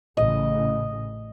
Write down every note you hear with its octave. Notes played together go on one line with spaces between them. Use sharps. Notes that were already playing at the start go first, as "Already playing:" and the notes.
A1 C#3 D#5